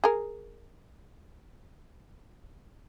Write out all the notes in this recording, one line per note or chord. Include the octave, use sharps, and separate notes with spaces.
G#4 A#4